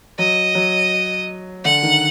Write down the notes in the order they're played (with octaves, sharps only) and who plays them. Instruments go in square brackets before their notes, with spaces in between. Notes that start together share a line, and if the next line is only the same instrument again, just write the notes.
[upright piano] F#3 [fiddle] D#5
[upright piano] F#3
[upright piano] D3 [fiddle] F#5
[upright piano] D#3